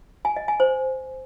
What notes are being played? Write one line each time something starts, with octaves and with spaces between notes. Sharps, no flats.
G#5
D#5
G#5
C5